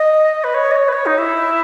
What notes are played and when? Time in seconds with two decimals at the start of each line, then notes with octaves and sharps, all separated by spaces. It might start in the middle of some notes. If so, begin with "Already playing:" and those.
Already playing: D#5
0.43 B4
0.54 C#5
0.71 D#5
0.75 C#5
0.88 B4
0.92 C#5
1.05 D#4
1.18 E4